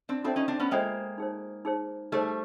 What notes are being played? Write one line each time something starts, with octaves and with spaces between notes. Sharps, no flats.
C4 D4
C4 D4 F4 A4 C5 E5 G5
C#4 D#4
C4 D4
B3 C#4
G#3 A#3 F4 A4 C5 E5 G5
D#4 G#4 C5
D#4 G#4 C5
G3 A3 D#4 G#4 C5